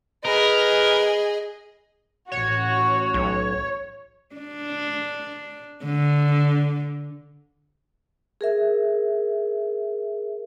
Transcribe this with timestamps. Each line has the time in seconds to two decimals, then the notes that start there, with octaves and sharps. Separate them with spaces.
0.25 G#4 A#4 B4 D#5
2.31 A1 F#4 C#5
3.14 B1
4.36 D4
5.85 D3
8.41 G#4 A#4 E5